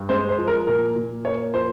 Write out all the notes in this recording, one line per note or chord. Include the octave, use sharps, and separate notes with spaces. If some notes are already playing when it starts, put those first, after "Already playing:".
Already playing: G2
G#3 C5
C5
F3
A#4
A#2 A#4
A#2
A#3 C#5
F3 C5